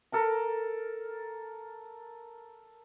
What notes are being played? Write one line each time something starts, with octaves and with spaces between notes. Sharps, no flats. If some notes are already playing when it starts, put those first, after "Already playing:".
A4 A#4 A#5